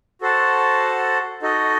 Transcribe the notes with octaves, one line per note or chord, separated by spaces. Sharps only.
F#4 A4 C5 F#5 A5
D#4 F#4 A4 D#5